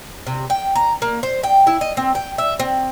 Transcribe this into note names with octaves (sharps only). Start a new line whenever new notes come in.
C3
G5
A#5
A#3
C5
G5
E4
D#5
C4
G5
E5
C4